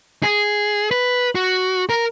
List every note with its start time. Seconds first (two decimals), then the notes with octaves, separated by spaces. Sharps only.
0.23 G#4
0.91 B4
1.35 F#4
1.89 A#4